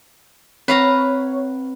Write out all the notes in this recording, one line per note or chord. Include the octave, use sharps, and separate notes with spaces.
C4 B4 C#5 F5 A#5